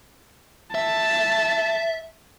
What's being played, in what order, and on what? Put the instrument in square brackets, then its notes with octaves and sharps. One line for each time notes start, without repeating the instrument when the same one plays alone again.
[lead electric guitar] E5 [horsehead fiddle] A5